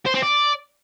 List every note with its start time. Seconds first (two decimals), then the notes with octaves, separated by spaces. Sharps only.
0.06 C5
0.15 C4
0.23 D5